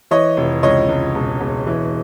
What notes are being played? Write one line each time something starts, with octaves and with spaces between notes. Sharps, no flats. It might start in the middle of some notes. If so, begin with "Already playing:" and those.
E3 C#5 D#5
F1
C#2 C#5 D#5
C#2
E1
E1
E3